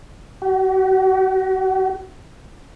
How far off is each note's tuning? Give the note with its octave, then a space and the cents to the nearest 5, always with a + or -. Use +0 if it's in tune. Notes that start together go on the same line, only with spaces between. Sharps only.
F#4 +40